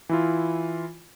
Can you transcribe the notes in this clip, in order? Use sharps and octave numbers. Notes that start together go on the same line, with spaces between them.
E3 E4 F4